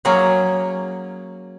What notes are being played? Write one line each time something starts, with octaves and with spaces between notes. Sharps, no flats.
F#3 A#3 C#4 F#4 G#4